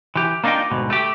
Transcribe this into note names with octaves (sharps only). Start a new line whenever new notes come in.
E3 G4
A#3 D4 D#4 F4 D#5 G5
D2 G#2 B2
A3 G4